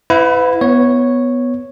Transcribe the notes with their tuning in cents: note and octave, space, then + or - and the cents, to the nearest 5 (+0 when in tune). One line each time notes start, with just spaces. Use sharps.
E4 +0 B4 +35 F#5 -45
B3 +0 C#5 -5